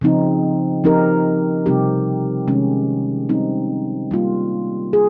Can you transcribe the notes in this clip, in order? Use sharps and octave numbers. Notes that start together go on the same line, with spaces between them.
C#3 F3 C4 D#4
F3 C4 D#4 G4 A#4
C3 G3 C4 D#4 G4
C3 D#3 G#3 C#4
G3 C4 D#4
G3 A#3 F4
G#4